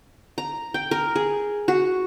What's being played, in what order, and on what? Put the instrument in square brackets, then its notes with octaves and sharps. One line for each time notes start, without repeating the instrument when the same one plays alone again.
[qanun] A#5
G5
A#4
G#4
F#4